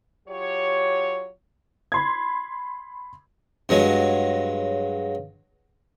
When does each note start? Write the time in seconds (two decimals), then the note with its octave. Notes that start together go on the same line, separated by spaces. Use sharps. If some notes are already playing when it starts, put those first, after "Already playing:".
0.27 F#3 F4 G4 C#5
1.92 B5 C6 G#6
3.69 G2 F#3 G#3 G#4 C#5 F5